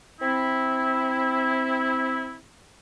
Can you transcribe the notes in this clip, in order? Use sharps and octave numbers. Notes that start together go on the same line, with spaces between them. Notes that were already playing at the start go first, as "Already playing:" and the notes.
C4 E4